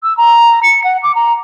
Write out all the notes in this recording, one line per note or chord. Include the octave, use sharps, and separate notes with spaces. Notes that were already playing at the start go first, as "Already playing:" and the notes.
E6
A#5
C#7
F#5
D6
A#5